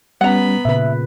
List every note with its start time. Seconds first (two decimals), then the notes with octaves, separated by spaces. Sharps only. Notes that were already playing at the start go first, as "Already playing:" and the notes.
0.21 G3 B3 C#4 F#5 A#5 B5
0.65 A#2 C#3 B4 E5